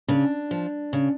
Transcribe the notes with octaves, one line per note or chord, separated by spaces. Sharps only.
C#3 D4
F3
C#3